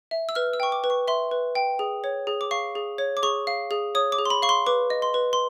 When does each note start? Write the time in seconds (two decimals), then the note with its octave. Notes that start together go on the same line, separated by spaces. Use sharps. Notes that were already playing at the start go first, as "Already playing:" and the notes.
0.11 E5
0.29 E6
0.35 B4 F6
0.53 E6
0.60 G5 C#6
0.72 D6
0.84 B4
0.90 C#6
1.08 E5 C6
1.31 B4
1.55 G5
1.79 G#4
2.04 C#5
2.27 G#4
2.41 D6
2.51 F5 C#6
2.75 G#4
2.98 C#5
3.17 D6
3.23 G#4 C#6
3.47 F5
3.71 G#4
3.95 C#5 D#6
4.12 D6
4.18 G#4
4.25 C6
4.30 B5
4.42 F5 C#6
4.49 C6
4.67 B4 D6
4.90 D#5
5.02 C6
5.14 B4
5.33 C6